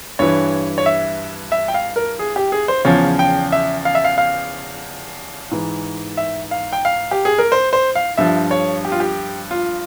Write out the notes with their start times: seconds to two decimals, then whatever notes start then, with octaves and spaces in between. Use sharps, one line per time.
0.19 G2 E3 C#5
0.78 C#5
0.86 E5
1.52 E5
1.68 G5
1.74 F5
1.96 A#4
2.19 G#4
2.36 G4
2.52 G#4
2.68 C5
2.85 E2 C#3 F3 C#5
3.19 G5
3.52 E5
3.85 F5
3.95 E5
4.04 F5
4.18 F5
5.51 G#2 E3
6.17 E5
6.51 F5
6.73 G5
6.85 F5
7.11 G4
7.25 G#4
7.38 A#4
7.52 C5
7.73 C5
7.95 F5
8.18 G2 F3 E5
8.51 C#5
8.85 G4
8.92 F4
9.00 G4
9.51 F4